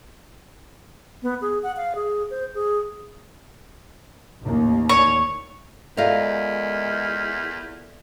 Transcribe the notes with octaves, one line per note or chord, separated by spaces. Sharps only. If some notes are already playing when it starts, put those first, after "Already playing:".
B3
G#4
F#5
F5
G#4
C5
G#4
A1 D#2 A#3
C#5
E2 G#3 F4 A4 A#4 D5 E5 F5